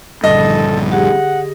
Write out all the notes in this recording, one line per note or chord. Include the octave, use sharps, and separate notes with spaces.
A#1 G2 D3 A4 D#5
G4 G#4 F#5